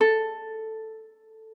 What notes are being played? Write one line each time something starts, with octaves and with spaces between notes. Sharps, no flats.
A4